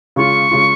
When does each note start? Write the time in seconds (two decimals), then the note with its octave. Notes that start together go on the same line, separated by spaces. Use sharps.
0.16 C#3 G#3 F4 C#6
0.51 C#3 G#3 F4